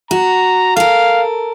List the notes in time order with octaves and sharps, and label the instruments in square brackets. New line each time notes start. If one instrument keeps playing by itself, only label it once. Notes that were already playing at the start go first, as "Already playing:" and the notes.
[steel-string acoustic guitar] F#4 [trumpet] A#5
[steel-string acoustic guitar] A4 A#4 [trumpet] F5